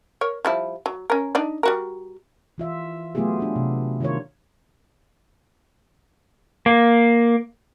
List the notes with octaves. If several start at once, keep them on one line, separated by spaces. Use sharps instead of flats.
A#4 C#5
F3 G3 E4
F#3
C#4 A#4
D4 D#4 D5
G3 F#4 A#4
E3 F4 E5
F#3 A3 B3 F4 G4 G#4
D4 F4
C3
D#3 D4 F4 A#4 C#5
A#3